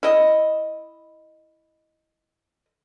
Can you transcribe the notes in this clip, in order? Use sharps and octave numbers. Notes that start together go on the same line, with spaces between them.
E4 D#5